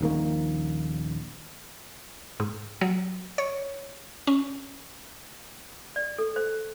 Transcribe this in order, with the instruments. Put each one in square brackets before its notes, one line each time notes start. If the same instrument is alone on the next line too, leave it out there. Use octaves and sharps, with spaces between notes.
[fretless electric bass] D#1 A#1 D#3 A#3
[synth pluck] G#2
F#3
C#5
C#4
[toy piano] D5
A4
C5